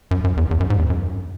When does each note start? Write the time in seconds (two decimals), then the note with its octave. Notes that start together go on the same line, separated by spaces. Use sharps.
0.11 F#2
0.24 F#2
0.37 E2
0.51 E2
0.60 F#2
0.70 G#2
0.79 E2
0.90 F#2